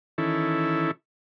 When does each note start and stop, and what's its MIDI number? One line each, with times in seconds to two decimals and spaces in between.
0.18 0.91 51
0.18 0.91 52
0.18 0.91 61
0.18 0.91 64
0.18 0.91 69